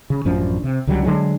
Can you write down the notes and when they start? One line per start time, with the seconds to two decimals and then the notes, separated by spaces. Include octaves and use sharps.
0.10 C#3
0.25 A1 F#2 F3 D4
0.64 C3
0.87 C#2 D3 F#3 G3
1.04 D3 D#3 F#3 G#3